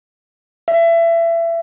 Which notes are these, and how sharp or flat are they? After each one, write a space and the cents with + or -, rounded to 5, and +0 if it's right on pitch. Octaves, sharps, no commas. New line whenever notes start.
E5 +30